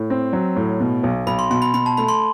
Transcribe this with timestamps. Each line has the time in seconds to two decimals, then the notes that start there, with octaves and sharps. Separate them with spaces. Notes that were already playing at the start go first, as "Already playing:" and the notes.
Already playing: A2
0.10 C4
0.33 F#3
0.56 A2
0.80 B2
1.04 B1
1.27 B1 B5
1.39 C6
1.50 B2 C6
1.62 B5
1.74 B2 B5
1.86 A5
1.97 A3 B5
2.08 C6